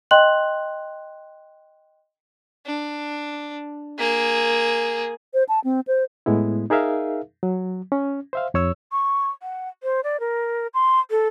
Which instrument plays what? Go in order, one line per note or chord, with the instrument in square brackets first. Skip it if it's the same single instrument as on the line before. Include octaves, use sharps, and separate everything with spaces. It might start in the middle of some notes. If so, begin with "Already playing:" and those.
[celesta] D#5 G5 C6 F#6 F#7
[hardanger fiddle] D4
A#3 G#4
[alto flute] C5
A5
C4
C5
[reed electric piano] A2 G#3 B3 E4
D#4 G#4 A#4 E5 F5
F#3
C#4
C5 E5 F5
F2 C#5 E6
[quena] C#6
F#5
C5
D5
A#4
C6
A4